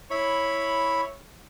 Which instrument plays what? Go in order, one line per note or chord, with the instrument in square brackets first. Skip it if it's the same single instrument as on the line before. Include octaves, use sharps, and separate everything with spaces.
[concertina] E4 B5 [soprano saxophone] C#5